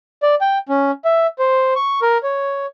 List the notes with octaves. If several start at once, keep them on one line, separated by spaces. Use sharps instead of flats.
D5
G5
C#4
E5
C5
C#6
A#4
C#5